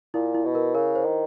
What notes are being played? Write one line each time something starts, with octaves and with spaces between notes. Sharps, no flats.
A#2 E4
E4
B2
A#4
C#3 A#4
C5
D#3